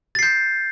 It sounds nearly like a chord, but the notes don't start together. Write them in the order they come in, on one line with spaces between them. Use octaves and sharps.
A6 C7 G6